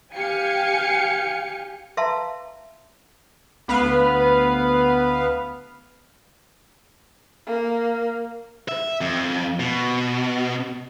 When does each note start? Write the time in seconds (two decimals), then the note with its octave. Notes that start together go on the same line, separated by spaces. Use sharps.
0.13 G4 F5 G5 G#5 C#7
1.97 B4 E5 F5 A5 A#5 C6
3.68 D2 B3 B4 F5
7.46 A#3
8.68 E5
9.01 F2
9.60 B2